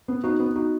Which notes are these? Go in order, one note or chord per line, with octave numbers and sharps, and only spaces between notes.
B3
B3 D#4 F#4
B3
D#4 F#4